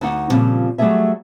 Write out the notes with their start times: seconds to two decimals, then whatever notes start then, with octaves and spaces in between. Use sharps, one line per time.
0.01 D2 D#4 F#5
0.29 A#2 C#3 E3 F3 G3 C4
0.78 F#3 G3 A3 F4 G#4 E5